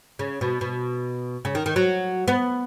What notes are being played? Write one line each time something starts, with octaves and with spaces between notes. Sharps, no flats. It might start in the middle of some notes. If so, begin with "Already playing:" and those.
C#3
B2
B2
C#3
D#3
D#3
F#3
B3